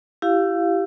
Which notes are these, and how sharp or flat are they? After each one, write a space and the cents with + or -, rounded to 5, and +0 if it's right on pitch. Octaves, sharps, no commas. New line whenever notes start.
E4 +20 G4 -15 F5 +0